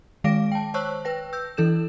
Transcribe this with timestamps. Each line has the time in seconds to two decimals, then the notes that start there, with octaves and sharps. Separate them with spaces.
0.24 D#3 G#3 F5 D6 A#6 D7
0.52 G5 A5
0.74 C5 C#5 A5 C#6 E6 F#6
1.05 B4 G5 A#6
1.33 E6 G6
1.57 E3 E4 A4 G6 E7